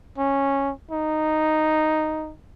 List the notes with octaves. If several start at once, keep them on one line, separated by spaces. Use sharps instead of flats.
C#4
D#4